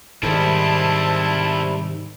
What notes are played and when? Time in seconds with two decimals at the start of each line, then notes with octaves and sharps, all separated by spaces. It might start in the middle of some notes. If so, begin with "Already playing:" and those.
0.23 G#2 C3 D#3 G3 C4 E4 A5